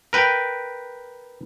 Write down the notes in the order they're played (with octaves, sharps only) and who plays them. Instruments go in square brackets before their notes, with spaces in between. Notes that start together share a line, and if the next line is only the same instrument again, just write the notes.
[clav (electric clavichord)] A#4 B4 G5